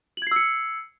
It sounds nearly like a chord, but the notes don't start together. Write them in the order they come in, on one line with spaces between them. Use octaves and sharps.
F#7 G#6 C7 E6 C#7